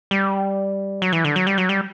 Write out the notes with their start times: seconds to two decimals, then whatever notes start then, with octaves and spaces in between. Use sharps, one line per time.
0.11 G3
1.02 F#3
1.13 E3
1.25 D3
1.36 F#3
1.47 G3
1.58 F#3
1.69 G3